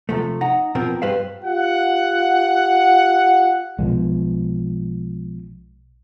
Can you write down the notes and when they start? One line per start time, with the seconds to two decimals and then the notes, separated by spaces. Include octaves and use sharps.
0.09 C3 F3 A3
0.41 D#4 F#5 A#5
0.75 B2 F3 C4 A#4
1.02 G2 G3 B4 C5 F5
1.44 F4 G4 F#5
3.79 B1 B2 F3 G#3